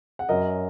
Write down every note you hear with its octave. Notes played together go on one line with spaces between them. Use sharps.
F#5
F#2 F#3 A#4 D#5